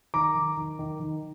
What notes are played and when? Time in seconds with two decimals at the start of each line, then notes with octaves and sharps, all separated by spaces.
0.14 D#3 A#5 D6
0.35 D#3
0.57 D#3
0.79 D#3
1.00 D#3